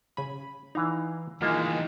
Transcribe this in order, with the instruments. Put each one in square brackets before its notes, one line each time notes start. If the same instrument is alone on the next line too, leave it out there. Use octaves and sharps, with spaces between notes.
[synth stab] C#3 B5 [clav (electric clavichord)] G#5
[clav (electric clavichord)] E3 F5 A#5 [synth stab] D#4
[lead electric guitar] D#3 E3 [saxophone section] G#3 [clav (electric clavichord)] A#3 F4